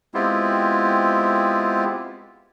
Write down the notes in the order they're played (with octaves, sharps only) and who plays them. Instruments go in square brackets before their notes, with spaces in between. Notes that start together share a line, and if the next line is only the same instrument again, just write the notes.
[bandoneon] G#3 B3 C4 E4 F4 G4